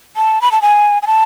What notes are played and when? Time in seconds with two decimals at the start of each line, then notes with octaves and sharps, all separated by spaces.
0.16 A5
0.42 B5
0.52 A5
0.62 G#5
1.02 G#5
1.07 A5